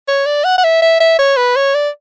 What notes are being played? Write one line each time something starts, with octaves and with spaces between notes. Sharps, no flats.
C#5
D5
F#5
F#5
E5
E5
E5
C#5
B4
C#5
D5